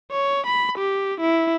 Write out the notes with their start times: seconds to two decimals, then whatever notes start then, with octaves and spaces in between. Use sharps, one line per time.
0.11 C#5
0.47 B5
0.78 G4
1.21 E4